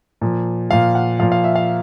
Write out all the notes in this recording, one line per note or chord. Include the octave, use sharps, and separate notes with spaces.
A#2 F3
A#2 F3 F5
F#5
A#2 F3 F5
F5
E5
F5